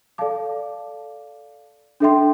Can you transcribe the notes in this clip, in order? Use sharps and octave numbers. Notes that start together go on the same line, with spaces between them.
A4 D5 F5 A5 D6
D4 A4 E5 G5 C6